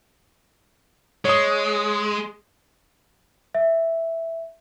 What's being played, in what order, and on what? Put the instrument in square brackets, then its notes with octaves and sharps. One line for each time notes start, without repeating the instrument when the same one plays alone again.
[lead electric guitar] G#3 [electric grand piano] C#5 D#6
[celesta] E5